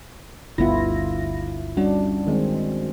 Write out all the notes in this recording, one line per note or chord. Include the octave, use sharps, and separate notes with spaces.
G1 D2 B3 E4 F4 A#6
G3 C#4 D4 F#4
D#3 G#3 C4